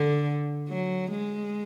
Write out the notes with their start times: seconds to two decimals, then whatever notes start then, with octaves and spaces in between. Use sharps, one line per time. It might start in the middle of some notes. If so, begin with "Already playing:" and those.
Already playing: D3
0.69 F#3
1.11 G#3